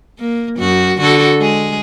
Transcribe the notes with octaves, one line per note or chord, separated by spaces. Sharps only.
A#3
F#2 F#4
D3 F#4 A4
G#3 G#4